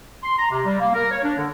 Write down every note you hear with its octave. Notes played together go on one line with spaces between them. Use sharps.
C6
A#5
C3
G3
A#3
A#4
C#5
D4
D3